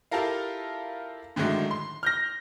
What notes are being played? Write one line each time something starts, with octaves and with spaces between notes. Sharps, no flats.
E4 F4 G4 A4 A#4 F5
A2 D3 D#3 F#3 G#3 A3
C6
F6 G6 A#6